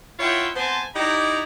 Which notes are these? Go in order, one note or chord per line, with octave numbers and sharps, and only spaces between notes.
E4 F4 C#5 E5 F#5 G5
B3 C4 C5 G#5 A5
D#4 E4 G4 D5 A#5